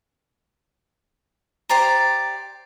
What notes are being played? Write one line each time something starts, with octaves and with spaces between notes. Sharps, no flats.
G4 C5 D5 A#5